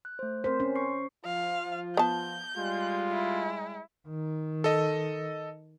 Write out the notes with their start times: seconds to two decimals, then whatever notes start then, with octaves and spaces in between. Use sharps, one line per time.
0.05 F#6
0.19 A3 C5
0.44 C4 A#4 C5 B6
0.60 C#4
0.76 C#6 C7
1.25 F3 F4 F5
1.97 B3 A5 G6
2.57 G3 G#3 F4
3.12 E4
4.08 D#3
4.64 A4 D#5